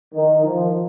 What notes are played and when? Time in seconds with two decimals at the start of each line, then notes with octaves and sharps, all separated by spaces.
0.14 D#3
0.45 F3